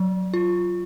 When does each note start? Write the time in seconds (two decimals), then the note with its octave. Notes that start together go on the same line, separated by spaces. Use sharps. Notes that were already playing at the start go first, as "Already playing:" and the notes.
Already playing: F#3
0.34 F4